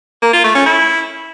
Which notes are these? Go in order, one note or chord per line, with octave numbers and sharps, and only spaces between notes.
A#3
F4
A3
C#4
E4